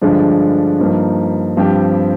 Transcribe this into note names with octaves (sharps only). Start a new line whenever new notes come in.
G2 D3 F3 G#3 D4
G2 F3 A#3 D#4
G2 F3 C4 G4